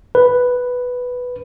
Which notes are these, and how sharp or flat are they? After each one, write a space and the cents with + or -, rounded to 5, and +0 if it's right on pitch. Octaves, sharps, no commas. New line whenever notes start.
B4 +0